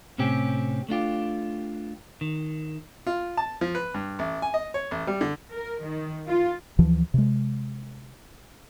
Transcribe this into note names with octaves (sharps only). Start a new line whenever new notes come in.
A2 C3 C4 C#4 G4
A3 D4 F4 G4
D#3
F4
A5
F3
B4
G2
A1
G#5
D#5
C#5
A1
G3
D3
A#4
D#3
F4
D2 E3 F3
C3 G#3